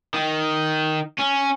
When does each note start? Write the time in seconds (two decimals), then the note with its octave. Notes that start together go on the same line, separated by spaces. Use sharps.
0.14 D#3
1.18 C#4